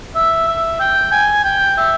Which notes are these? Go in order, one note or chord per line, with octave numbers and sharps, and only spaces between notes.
E5
E5
G5
G#5
G5
E5